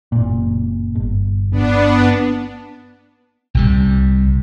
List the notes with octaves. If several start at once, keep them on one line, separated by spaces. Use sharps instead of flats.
F#1 A#2
G1
G1 B3 D4
C2 C3 G3